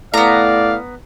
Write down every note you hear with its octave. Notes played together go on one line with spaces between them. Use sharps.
A2 B3 D5 F5 A#5